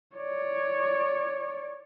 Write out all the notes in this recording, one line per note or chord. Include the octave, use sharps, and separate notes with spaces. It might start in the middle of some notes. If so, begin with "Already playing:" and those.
C#5 D5